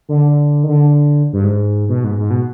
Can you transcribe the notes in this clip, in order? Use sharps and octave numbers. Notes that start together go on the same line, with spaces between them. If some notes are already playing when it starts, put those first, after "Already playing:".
D3
D#3
D3
G2
G#2
B2
G#2
G#2
B2